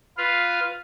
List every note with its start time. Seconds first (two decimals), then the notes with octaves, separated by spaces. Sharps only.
0.18 F4 B4 F5